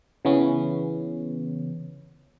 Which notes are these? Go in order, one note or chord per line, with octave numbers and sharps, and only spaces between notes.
C#3 E3 B3 C#4